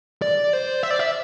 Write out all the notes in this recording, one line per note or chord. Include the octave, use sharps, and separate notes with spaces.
D5
C5
E5
D5
E5